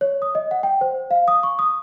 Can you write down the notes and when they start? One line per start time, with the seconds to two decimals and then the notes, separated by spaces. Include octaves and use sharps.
0.01 C#5
0.22 D#6
0.35 D#5
0.51 F#5
0.63 G5
0.81 C5
1.11 F5
1.28 D#6
1.43 C#6
1.59 D#6